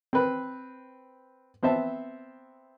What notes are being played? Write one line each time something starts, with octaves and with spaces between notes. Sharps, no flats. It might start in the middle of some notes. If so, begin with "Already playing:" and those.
C4 B4
B3 C4 C5 E5 A5